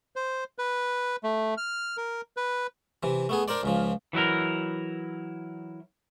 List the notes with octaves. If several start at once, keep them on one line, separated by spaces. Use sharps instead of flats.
C5
B4
A3
F6
A#4
B4
C3 E3
A3 B3 G#4
D4 A#4 C5 D5
C#2 C#3 F3
E3 F#3 E4 A#4